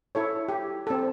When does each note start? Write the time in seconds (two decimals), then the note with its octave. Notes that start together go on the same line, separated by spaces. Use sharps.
0.15 E4 A4 C#5
0.48 G4
0.87 C4 A4